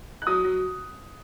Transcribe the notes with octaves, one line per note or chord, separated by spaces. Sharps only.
F#6
F#3 D#6
F#3